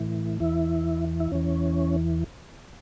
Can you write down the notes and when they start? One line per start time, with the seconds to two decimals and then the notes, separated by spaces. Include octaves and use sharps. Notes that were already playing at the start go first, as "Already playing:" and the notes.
Already playing: A2 E3
0.40 E2 E3 E4
1.20 E4
1.32 E2 E3 C#4